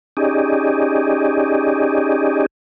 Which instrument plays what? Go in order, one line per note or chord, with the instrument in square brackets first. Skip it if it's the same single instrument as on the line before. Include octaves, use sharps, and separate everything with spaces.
[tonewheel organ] C#4 D#4 G4 G#4 D5 D#5